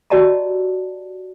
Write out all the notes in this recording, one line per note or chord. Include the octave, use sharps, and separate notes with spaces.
F#4 G4 D5 D#5 A5 A#5